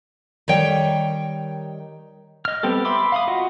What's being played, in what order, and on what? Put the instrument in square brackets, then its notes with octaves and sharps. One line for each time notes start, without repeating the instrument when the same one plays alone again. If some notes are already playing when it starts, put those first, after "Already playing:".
[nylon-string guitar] D#3 G3 C#5 G5
[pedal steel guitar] D#5 F6
G3 B3 C4 G4 A4
E5 B5 C6 D6 E6
F5 B5 D#6
F4 F#4 D#5 F#5